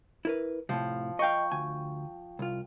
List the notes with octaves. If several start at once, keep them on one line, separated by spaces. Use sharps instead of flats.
E4 A#4 B4
A2 C3 F3
D#5 F5 G5 C#6
D2 G#5
C2 F4